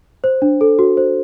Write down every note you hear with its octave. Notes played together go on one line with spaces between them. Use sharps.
C5
D4
A4
F#4
C5